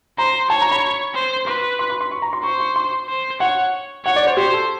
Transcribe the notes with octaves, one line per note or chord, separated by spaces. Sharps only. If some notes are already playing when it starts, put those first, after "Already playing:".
C5 A#5
C#5 A5
A#5
B5
C5
B4 C6
C6
B5
C6
C#6
A#5
C6
C5 C#6
C#6
C6
C5
C#5 F#5
C#5 F#5
D5
C5
G4 C5
A4